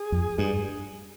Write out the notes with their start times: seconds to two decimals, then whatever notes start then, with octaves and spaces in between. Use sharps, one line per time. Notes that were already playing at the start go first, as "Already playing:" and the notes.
Already playing: G#4
0.12 F2
0.38 G2 G#4